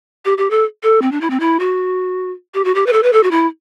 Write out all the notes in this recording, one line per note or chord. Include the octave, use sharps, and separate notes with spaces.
G4
G4
A4
A4
C4
D4
E4
C4
E4
F#4
G4
F#4
G4
B4
A4
B4
A4
F#4
E4